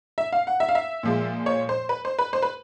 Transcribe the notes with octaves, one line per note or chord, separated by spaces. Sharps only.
E5
F5
F#5
E5
F5
E5
A#2 F3 G#3
C#5
C5
B4
C5
B4
C5
B4